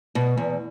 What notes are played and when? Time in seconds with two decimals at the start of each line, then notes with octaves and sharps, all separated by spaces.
0.15 B2
0.37 E2